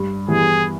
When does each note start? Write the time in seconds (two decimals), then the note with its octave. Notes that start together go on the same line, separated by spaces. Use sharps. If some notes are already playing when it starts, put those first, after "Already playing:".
Already playing: G2
0.28 E3 G3 B3 G#4